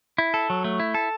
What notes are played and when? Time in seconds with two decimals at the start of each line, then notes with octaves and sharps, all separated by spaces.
0.18 E4
0.34 A4
0.50 F#3
0.64 A3
0.80 E4
0.94 A4